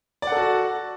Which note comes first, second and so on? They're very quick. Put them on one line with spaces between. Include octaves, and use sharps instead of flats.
D5 F#5 A4 F#4